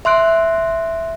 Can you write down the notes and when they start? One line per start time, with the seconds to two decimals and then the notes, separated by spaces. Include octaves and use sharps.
0.05 E5 C6 F#6 D7